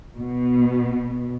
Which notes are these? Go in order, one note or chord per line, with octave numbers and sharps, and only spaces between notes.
B2